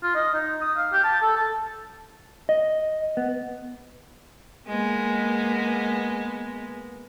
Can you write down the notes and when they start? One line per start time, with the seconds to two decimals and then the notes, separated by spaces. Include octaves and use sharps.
0.03 F4
0.15 D#5
0.34 D#4
0.61 D#6
0.77 F5
0.92 G4
1.04 A5
1.22 A4
1.36 A5
2.49 D#5
3.17 B3
4.68 G#3 A#3 B3